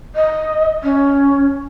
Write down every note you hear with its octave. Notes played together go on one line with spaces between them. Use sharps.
D#5
C#4